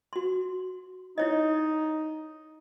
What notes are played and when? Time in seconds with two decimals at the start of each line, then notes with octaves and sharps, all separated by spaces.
0.13 F#4 C6
1.18 D#4 E4 C#5 D#5